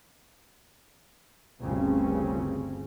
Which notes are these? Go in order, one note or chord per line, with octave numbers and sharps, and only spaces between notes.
G1 D2 C#3 C4 C#4